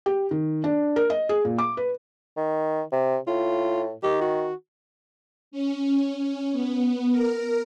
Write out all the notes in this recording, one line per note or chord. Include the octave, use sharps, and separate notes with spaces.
G4
D#3
D4
A#4
D#5
G#4
A#2
D6
B4
D#3
C3
A2 F4
D#3 G4
F#4
C#4
C#4
B3
A#4